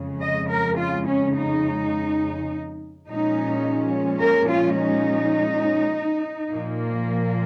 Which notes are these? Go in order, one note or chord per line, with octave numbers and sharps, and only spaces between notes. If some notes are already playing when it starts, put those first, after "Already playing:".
Already playing: F2 C#3 G#3
D#5
A#4
F4
C#4
D#4
A#2 F3 G#3 C#4 D#4
A#4
F4
D#4
A#2 F3 A#3